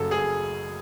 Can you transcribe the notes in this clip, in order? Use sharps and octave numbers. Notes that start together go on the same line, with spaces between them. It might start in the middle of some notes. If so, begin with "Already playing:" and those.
Already playing: F#1 F#2 C#3 A4
G#4
F#2